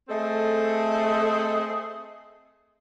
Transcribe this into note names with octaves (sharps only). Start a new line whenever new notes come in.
A3 C4 G#4 A4 D#5